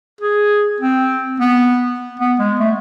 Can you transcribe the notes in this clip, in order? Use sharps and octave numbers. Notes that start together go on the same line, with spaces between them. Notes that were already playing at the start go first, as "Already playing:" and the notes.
G#4
C4
B3
B3
G#3
A3